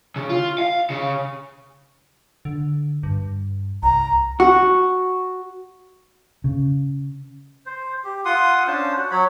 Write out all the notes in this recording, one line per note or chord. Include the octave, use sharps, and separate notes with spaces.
C#3
F4
F5
C#3
D3
G2
C2 A#5
F#4
C#3
C5
G4
F4 F#5 C6 D#6
C#4 D4 C5 A5
F#4 F#5
F#3 C#5 B5